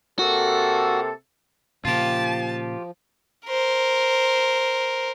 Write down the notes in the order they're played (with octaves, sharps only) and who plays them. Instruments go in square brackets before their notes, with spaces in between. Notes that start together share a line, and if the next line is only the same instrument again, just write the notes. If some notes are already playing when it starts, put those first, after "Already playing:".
[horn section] C3 A#3 A4 [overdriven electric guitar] F#4
[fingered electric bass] A#2 C#3 A#3 [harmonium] F3 [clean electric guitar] F4 G4 [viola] A5
[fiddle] A#4 C5